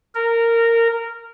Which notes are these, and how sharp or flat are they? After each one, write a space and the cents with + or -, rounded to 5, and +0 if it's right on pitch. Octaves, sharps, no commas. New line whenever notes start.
A#4 -15